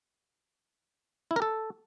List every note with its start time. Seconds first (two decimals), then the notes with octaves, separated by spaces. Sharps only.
1.31 E4
1.36 A#4
1.42 A4